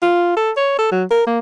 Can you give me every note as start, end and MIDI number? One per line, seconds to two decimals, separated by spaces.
0.02 0.32 65
0.36 0.51 69
0.57 0.78 73
0.79 0.90 69
0.92 1.04 54
1.11 1.25 70
1.27 1.39 58